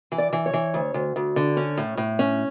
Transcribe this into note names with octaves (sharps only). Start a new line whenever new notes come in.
E3
D5
E3
C#5
E3
D2
D2
D2
D3
C#4
A2
A2
C#4